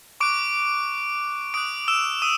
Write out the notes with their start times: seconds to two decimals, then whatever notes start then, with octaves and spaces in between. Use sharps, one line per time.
0.20 C#6 D6 F#6 D7
1.54 D6 D#6 F#6 D7
1.88 E6 E7
2.22 D#6 D#7